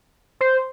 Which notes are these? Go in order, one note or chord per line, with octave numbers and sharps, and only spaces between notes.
C5